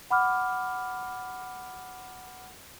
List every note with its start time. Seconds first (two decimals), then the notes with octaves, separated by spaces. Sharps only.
0.10 F#5 B5 D6 F6